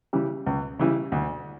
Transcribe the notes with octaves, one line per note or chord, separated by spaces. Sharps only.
C#3 E3 G3
C#2
C#3 E3 G3
D2